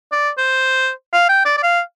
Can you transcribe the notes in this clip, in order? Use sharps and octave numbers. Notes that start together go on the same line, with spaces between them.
D5
C5
F5
G5
D5
D5
F5